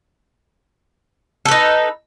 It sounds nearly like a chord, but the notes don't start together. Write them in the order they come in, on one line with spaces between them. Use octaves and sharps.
A4 B4 D#4